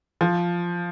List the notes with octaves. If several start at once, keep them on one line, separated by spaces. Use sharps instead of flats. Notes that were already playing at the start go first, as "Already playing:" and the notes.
F3